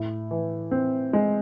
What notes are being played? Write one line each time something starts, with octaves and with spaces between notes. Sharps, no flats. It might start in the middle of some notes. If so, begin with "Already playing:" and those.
Already playing: A2
E3
C4
G#3